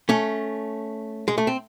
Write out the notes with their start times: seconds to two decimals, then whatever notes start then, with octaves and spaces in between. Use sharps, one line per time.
0.09 A3 C#4
1.28 G#3
1.38 A3
1.47 C4